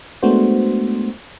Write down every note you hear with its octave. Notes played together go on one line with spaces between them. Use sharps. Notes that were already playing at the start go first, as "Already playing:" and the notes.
G#3 A3 B3 D4 F#4 C5